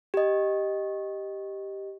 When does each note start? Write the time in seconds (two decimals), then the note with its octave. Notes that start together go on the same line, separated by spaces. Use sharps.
0.14 G4 D#5